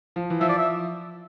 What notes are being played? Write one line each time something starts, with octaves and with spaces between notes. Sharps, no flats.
F3
E3
F3 E5
D5
E5